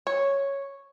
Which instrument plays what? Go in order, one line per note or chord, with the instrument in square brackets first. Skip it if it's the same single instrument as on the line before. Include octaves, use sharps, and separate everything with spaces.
[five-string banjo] C#5